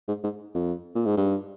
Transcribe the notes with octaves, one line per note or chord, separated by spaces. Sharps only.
G#2
G#2
F2
A#2
G#2
G2